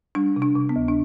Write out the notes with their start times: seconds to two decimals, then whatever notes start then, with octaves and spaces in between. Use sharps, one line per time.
0.15 G3 D4
0.36 C3
0.42 D4
0.56 C3
0.69 B3
0.76 D2
0.88 D4